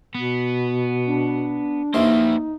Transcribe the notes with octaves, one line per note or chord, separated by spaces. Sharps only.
B2 B3
D4
D#2 E3 A#3 D#4 C5